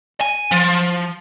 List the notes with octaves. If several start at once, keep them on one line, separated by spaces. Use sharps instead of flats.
G#5
F3